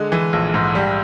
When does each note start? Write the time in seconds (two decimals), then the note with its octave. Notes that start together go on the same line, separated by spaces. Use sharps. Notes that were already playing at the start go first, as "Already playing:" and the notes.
Already playing: D3 G#3
0.12 E3
0.33 A#1
0.54 G#2
0.75 G3